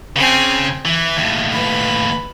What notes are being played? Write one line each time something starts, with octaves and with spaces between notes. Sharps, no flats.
C#3 C4 G#5
E3 E5
D#2 A2
B4 B5